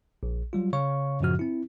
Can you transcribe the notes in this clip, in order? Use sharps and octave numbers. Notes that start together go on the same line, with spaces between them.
A#1
F#3 G3 F4
C#3 C#5 F5 C#6
F#2 A2 C#3 F3 F#4 F6
C4 E4